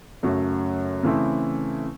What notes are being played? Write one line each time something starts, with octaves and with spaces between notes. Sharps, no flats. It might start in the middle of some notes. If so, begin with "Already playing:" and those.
F#2 C#3 F#3 A3
C#3 E3 A3 C4 E4